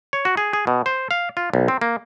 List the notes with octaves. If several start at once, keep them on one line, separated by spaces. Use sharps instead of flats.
C#5
F#4
G#4
G#4
B2
C5
F5
F4
B1
C4
A#3